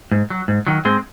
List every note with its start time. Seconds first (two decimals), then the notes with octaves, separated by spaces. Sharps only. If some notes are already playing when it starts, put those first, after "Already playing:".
0.11 G#2
0.30 F#3
0.48 G#2
0.67 D#3 F#3
0.85 G#2 G#3 C4